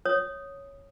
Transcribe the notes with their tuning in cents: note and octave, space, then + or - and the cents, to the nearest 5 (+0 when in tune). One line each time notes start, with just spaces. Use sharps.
C#5 +0 D#6 +0